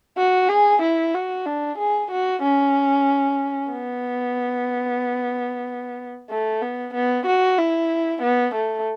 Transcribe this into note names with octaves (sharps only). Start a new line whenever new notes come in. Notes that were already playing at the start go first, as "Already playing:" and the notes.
F#4
G#4
E4
F#4
D4
G#4
F#4
C#4
B3
A3
B3
B3
F#4
E4
B3
A3